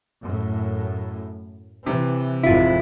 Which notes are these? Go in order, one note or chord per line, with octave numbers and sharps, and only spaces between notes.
F#2 A2
C3 E3
G#1 F2 E4 F4